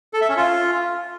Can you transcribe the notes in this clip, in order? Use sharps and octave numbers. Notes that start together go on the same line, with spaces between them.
A4
E5
C#4
F4